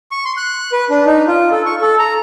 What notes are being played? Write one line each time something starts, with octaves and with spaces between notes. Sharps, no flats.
C#6
C6
F#6
B4
D4
D#4
F4
A4
C#6
A4
A#5